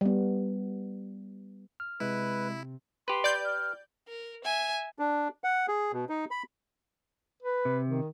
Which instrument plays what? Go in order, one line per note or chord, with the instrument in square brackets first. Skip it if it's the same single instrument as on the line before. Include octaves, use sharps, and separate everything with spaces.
[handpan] G3 B3
[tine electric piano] F6
[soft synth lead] C3 [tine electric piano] G#3 [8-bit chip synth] E4 [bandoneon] B4
[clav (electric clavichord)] G4 B4 [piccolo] C6
[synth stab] D5 G6
[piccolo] F6
[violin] A#4
E5 G#5
[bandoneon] D4
F#5
G#4
B2
D#4
B5
[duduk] B4
[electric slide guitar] C3
[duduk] D#3